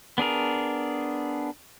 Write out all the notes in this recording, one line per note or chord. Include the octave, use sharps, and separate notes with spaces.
B3 D4 G#4 A#4